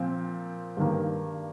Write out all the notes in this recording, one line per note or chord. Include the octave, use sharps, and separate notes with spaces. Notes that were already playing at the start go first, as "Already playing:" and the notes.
Already playing: A#2 F3 C4
G2 D#3 A#3